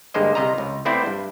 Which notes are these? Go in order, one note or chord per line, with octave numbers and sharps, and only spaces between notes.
G2 D3 G#3 A#3 C5 D#5
C2 C3 D#5 F5 A#5
C#2
A3 B3 C4 E4 C5 D5
G2